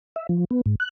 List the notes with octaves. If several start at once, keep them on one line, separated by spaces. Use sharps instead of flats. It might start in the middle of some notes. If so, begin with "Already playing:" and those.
E5
F3
B3
G#2
F#6